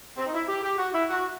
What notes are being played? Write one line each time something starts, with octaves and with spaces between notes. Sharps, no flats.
C4
D#4
E4
G4
G4
F#4
E4
F#4